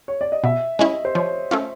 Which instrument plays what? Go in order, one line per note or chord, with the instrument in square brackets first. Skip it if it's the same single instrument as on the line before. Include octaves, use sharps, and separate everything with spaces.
[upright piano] C#5
D5
D#5
[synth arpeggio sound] B2 [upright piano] E5
[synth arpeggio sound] G#3 C#4 E4 [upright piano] D#5
[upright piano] C5
[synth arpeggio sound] F3 [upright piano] C#5
[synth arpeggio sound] A3 C#4 F4